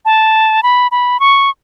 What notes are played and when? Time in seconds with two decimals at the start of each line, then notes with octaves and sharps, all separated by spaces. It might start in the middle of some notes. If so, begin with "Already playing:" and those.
0.05 A5
0.63 B5
0.91 B5
1.20 C#6